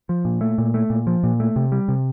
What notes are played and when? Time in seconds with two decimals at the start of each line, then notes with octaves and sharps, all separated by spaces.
0.09 F3
0.25 A#2
0.41 A3
0.58 A#2
0.74 A3
0.90 A#2
1.07 F3
1.23 A#2
1.40 A3
1.56 C3
1.72 G3
1.88 C3